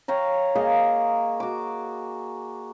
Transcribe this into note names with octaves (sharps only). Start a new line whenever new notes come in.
C#5 F5 G5 A#5
A#3 G#4 D#5 F5
F#4 D6